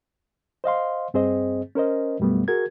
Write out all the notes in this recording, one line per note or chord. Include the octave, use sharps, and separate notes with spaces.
C5 D#5 F5 C6
G2 C4 G#4 C5 D#5
C#4 A#4 C5 D#5
F#2 B2 G3 A3 B3
F#4 G#4 A#4 G#6